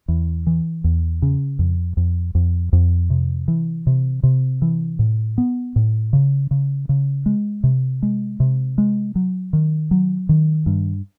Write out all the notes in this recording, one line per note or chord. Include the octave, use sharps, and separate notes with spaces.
E2
E3
E2
C#3
F2
F2
F2
F2
C3
E3
C3
C3
E3
A2
B3
A2
C#3
C#3
C#3
G#3
C3
G#3
C3
G#3
F#3
D#3
F#3
D#3
G2